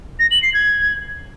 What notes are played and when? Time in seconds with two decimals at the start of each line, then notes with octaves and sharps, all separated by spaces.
0.19 A#6
0.31 F#7
0.43 C7
0.54 G#6